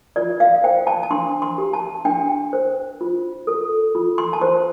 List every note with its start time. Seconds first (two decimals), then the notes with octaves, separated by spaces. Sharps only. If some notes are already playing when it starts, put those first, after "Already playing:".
0.16 F4 D5
0.40 F5
0.64 C5 G5
0.87 A5
1.03 A5
1.11 D4 C6
1.42 C6
1.58 G4
1.73 A5
2.05 D4 G5
2.53 C5
3.01 F4
3.47 A4
3.95 F4
4.18 C6
4.33 A5
4.41 C5 C6